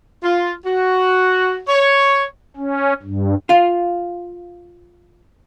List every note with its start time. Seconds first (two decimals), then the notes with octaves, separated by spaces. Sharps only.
0.23 F4
0.66 F#4
1.68 C#5
2.56 C#4
3.02 G2
3.49 F4 F5